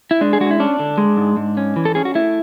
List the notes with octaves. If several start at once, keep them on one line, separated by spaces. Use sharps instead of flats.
E4
G#3 D4
G#4
G#3 F#4
E4
C#4 D4
D3
G#3
G#2
G#2
C#4
E3
A4
C#4 G#4
F#4
A3 E4